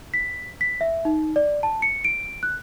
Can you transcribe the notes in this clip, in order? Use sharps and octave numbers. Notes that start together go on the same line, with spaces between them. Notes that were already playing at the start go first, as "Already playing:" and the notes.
B6
B6
E5
D#4
D5
A5
C#7
D7
F#6